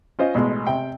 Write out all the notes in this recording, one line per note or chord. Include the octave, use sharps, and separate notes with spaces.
C#4 F4 C5 D#5
A1 B2 G#3
C3 G5